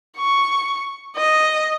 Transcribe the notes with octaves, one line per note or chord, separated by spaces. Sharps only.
C#6
D#5